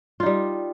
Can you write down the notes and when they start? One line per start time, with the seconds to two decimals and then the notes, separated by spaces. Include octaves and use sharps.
0.20 F4
0.23 D#4
0.26 G3